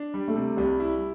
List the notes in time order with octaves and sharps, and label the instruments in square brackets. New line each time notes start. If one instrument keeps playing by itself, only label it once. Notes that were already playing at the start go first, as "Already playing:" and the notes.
Already playing: [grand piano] D4
G3
[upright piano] A3
[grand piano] C3
[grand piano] C2 [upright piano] G3
[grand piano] E4